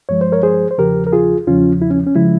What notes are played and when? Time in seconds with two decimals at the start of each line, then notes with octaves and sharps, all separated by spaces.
0.09 G2 F3 G#3 C#5
0.21 C5
0.32 A#4 C#5
0.43 G#4 C5
0.71 C5
0.78 E2 C#3 F3 G4 A#4
1.07 A#4
1.13 F4 G#4
1.47 E2 C#3 F3 C#4 F4
1.82 E4
1.90 C#4
2.07 C#4
2.16 C#3 F3 G#3 E4